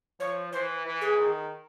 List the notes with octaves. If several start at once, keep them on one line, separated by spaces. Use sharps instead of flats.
F3 C#5
E3 C5
E3
G#4
D#3